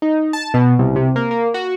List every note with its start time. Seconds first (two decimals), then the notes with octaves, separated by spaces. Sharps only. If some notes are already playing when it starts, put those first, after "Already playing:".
0.02 D#4
0.33 A5
0.54 B2
0.79 C2
0.96 C3
1.16 A#3
1.31 A#3
1.54 F#4